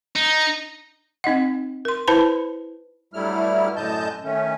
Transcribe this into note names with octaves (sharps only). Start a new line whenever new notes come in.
D#4
C4 D#4 D#5 F#5
A#4 C6
E4 B4 C5 A5 B5
G2 F#3 G3 A3 E4 F6
F#2 A2 D3 D#5 A5 G6
D#3 A3 C#4